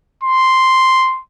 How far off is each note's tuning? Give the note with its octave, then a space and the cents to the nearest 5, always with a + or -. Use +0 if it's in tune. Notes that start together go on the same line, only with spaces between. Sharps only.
C6 -5